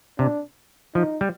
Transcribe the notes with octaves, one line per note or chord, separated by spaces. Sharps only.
C3 D4
F3 D#4
G3